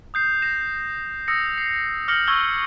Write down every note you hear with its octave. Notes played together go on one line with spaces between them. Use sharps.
D#6 G6 C7
A#6 C7 E7
D#6 E6 A#6 C#7
C7
D6 F6 G6 A#6 C#7 F#7
C#6 E6 G#6 A#6 G7